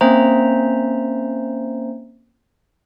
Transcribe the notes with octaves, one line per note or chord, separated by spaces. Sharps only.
A#3 C4 C#4 C5 E5 A#5